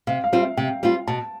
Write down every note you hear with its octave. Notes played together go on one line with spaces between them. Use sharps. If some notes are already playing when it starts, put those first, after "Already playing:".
C3 F5
F5
G3 C4 F4
E5
C3 G5
G3 C4 F4
B2 A5